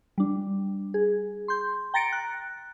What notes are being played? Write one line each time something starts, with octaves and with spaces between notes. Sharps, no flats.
G3 D4
G#4
C6 G6
G5 A#5 A6 A#6 C#7 D7
F#6